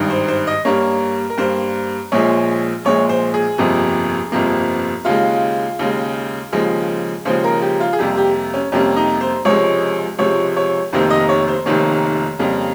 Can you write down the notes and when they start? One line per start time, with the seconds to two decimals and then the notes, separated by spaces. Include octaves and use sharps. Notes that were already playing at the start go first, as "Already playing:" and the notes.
Already playing: G#1 G2 D#3
0.10 C5
0.28 C5
0.47 D#5
0.65 G2 G3 A#3 C#5
1.30 A#4
1.38 G2 G3 A#3 C5
2.12 A#1 A#2 F3 G#3 C#5
2.85 A#1 A#2 F3 G#3 C#5
3.09 C5
3.34 G#4
3.58 G1 F2 C3 F3 A#3
4.32 G1 F2 C3 F3 A#3
5.05 D#2 C#3 G#3 F4
5.79 D#2 C#3 G#3
6.52 D#2 C#3 F3 G#3
7.25 D#2 C#3 F3 G#3 C5
7.44 A#4
7.62 G4
7.80 F4
7.93 G#4
7.98 F2 C3 G3 A#3 G4
8.17 G4
8.54 C#4
8.72 F2 C3 G3 A#3 C#4
8.96 D#4
9.21 C5
9.45 C#2 C3 F3 G#3 C#5
10.19 C#2 C3 F3 G#3 C#5
10.56 C#5
10.93 F1 F2 C3 D#3 A#3 C5
11.10 D#5
11.29 C#5
11.48 C5
11.66 F1 F2 C3 D#3 A#3 C#5
12.39 F2 C#3 G3 A#3